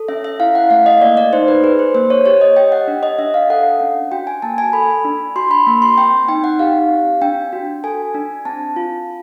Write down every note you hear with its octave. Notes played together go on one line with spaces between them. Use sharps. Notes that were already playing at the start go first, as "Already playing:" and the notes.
Already playing: A4
C#4 E5
E5
E4 F5
F#5
A3 F5
D#5
A#3 D5
D5
D#4 C5
B4
G#4 B4
C5
A#3 C5
C#5
G4 C#5
D#5
G4 G5
F#5
D4
D#5
D4 E5
F5
A4 F#5
C#4
F#4 G5
G#5
A#3 A5
G#5
A4 B5
D4
F#4 C6
B5
A#3 B5
C6
C4 G5
D#4 G5
F#5
G4 F5
C4
D4 G5
F#4
A4 G#5
D4
C4 A5
F4